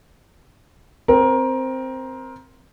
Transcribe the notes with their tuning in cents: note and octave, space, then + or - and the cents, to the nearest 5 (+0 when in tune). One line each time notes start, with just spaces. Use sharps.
C4 +0 A#4 +20